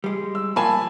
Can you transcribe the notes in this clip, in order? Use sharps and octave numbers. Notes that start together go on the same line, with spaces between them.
G3 G#3
E6
A#2 F3 A#3 G#5 A5 B5